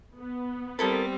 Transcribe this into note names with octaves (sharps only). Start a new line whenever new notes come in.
B3
G3 C4 E4 A4 A#4 B5 D#6 A6